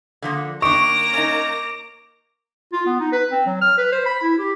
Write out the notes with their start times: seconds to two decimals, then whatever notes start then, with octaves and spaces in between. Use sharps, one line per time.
0.22 D3 F3 A#3
0.62 D#3 A#3 D4 A#5 C#6 D6 D7
1.13 C#4 D#4
2.73 F4
2.86 B3
3.00 D#4
3.12 B4
3.32 C4
3.46 F#3
3.62 F6
3.78 B4
3.92 C5
4.06 B5
4.22 E4
4.39 G4